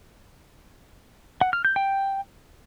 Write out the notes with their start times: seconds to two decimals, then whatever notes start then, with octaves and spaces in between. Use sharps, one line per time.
1.41 F#5
1.53 F6
1.65 G6
1.76 G5